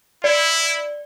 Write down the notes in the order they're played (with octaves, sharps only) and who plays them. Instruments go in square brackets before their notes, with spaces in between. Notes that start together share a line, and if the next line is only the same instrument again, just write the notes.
[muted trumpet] E4 [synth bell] D5